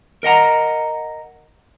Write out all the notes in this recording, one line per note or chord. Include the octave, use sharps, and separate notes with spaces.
A#4 D#5 F#5 A#5